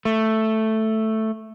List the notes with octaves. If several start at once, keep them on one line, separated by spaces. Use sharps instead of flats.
A3